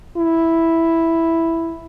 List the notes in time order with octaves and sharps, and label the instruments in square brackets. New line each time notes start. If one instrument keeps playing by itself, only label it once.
[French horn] E4